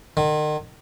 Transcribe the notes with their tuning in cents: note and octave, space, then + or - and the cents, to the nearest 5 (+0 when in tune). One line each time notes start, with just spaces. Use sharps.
D#3 -40